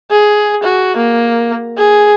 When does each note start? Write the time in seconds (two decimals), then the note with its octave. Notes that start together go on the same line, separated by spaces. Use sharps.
0.11 G#4
0.63 F#4
0.97 A#3
1.78 G#4